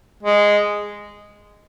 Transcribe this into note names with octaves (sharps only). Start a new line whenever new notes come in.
G#3